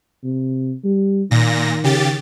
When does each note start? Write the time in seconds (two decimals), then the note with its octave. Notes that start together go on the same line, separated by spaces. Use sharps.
0.23 C3
0.84 G3
1.31 A#2 D#3 A#6
1.84 C#3 G4 A6